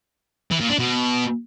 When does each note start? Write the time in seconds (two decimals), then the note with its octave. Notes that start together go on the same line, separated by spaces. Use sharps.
0.51 E3
0.60 A#2
0.69 D4
0.79 B2